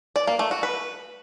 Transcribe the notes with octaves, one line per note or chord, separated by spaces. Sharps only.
D5
A#3
A3
F#4
B4